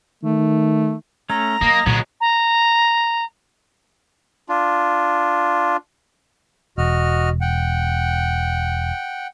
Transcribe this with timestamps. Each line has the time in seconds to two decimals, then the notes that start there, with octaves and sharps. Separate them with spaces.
0.23 D#3 A3
1.30 A3 C#4 A#5
1.61 F#3 A#3 D#5
1.86 A#2 D3 F#3 G#3 B3 F#4
2.20 A#5
4.49 D4 F4
6.78 E1 F#4 D#5 F6
7.41 F#5 G5